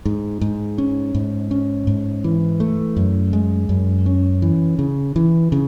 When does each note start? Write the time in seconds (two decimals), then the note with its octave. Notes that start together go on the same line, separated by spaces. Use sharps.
0.06 G#2
0.41 G#2
0.78 C#4
1.15 G#2
1.51 C#4
1.87 G#2
2.24 E3
2.60 A3
2.97 F#2
3.33 G#3
3.69 F#2
4.06 C#4
4.42 E3
4.79 C#3
5.16 E3
5.52 C#3